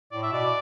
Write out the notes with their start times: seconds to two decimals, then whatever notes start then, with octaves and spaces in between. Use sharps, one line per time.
0.12 A2 D5
0.23 E5
0.32 B2 D5